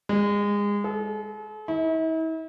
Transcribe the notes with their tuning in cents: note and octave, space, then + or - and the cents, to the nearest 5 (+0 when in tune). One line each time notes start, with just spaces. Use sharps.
G#3 -25
A4 -45
E4 -45